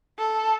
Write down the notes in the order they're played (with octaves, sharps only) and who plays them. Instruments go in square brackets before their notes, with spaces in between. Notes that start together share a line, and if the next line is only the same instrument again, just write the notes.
[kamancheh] A4